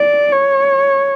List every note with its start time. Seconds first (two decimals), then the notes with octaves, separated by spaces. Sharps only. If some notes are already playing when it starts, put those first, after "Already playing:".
Already playing: D5
0.32 C#5